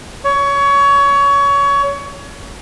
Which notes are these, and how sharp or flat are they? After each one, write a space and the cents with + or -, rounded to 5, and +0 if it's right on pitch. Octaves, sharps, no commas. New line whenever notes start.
C#5 +25